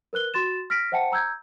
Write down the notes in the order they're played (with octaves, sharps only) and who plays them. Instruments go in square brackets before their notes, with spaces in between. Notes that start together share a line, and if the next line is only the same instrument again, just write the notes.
[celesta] A#4 B4 F#6 G7
F#4 C6 A6 E7
F6 A#6 B6 D7
C5 E5 F#5 G5 A5 C#7
A#5 E6 G6 G#6